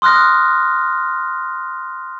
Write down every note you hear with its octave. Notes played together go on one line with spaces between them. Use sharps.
C6 D#6 F6 F#6 A#6